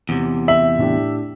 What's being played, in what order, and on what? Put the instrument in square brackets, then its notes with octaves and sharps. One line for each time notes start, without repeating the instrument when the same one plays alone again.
[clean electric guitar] E2 C3
[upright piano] E5 [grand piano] F#7
[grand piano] A2 D4 G4